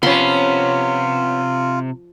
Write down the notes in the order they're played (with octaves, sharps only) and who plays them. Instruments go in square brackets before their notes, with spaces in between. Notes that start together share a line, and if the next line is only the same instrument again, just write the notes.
[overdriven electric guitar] C3 [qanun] F3 B5 C6 [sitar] B3 C#4 [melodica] F4